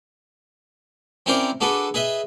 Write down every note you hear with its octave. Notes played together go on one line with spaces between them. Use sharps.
C4 C#4 E4 A#4 C5 D5
D4 F#4 G#4 A4 B4
G#4 B4 D#5 E5